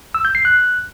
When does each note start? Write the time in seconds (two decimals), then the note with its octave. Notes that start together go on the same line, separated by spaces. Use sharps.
0.15 E6
0.25 G6
0.35 C7
0.45 F#6